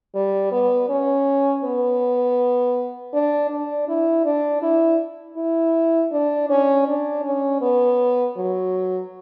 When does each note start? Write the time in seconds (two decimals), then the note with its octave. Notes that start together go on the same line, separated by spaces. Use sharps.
0.15 G3
0.52 B3
0.89 C#4
1.64 B3
3.14 D4
3.50 D4
3.88 E4
4.25 D4
4.62 E4
5.37 E4
6.12 D4
6.50 C#4
6.87 D4
7.24 C#4
7.61 B3
8.36 F#3